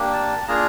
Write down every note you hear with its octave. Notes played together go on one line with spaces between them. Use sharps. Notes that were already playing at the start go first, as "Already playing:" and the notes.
Already playing: A#3 D4 G4
A5
A#3 D4 F4 G#4 A#5